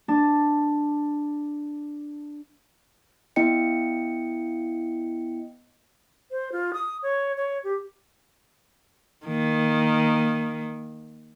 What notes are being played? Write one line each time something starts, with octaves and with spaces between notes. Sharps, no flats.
D4 A5
B3 E4 D#5 G5 C#7
C5
F4
D#6
C#5
C#5
G4
D#3 A#3